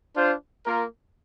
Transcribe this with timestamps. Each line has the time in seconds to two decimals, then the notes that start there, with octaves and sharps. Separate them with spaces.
0.15 D4 F4 C5
0.66 A#3 F4 A#4